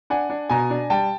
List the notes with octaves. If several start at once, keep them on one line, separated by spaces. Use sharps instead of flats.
D4 F#5 G#5
D4
B2 G#5 A#5
D4
G3 G5 A5